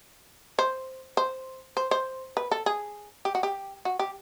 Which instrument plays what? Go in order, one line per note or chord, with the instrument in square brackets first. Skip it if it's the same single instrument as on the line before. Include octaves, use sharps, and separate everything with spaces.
[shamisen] C5
C5
C5
C5
B4
A4
G#4
G4
F#4
G4
F#4
G4